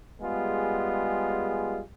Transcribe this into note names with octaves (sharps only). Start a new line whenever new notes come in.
G3 G#3 B3 F4 G#4